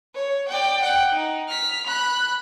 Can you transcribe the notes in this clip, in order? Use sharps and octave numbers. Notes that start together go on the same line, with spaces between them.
C#5
D5 G5
F#5 G5
D#4
F6 B6
B5 F#6